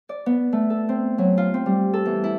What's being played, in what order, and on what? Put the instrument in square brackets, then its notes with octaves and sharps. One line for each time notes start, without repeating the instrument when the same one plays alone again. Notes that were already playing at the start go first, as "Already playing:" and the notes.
[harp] D5
B3
A3
A4
C4
F#3
F4
C4
G3
A4
E2
E4